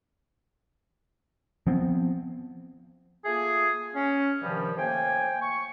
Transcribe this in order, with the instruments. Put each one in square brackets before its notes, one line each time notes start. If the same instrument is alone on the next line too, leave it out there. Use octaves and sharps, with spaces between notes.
[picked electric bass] F3 B3 C4
[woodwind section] A3 A#3 F4 G#4
C#4
G2 C3 D#3 F3 G3
A2 A#3 C5 G5 G#5
C#6